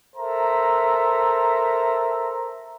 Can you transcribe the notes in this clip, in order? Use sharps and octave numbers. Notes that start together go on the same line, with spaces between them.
A4 A#4 C5 E5 A#5